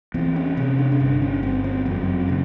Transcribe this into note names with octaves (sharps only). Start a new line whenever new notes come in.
E2 C4
C#4
C3 C#4
D4
C#4
G1 D4
C#4
G1 C4
C4
F#2 C4
C#3